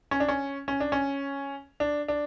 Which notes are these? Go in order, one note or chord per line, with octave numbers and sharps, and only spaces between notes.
C#4
D4
C#4
C#4
D4
C#4
D4
D4